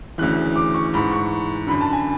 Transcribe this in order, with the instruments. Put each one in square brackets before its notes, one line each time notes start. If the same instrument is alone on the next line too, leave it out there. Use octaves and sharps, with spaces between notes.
[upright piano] D2 C#3 E3 F#6
D6
C#6
G#2 E3 B5
C#6
F#2 D3 B5
A5
G#5